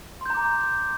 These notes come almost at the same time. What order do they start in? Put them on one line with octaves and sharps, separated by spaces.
C6 G6 A#5 D6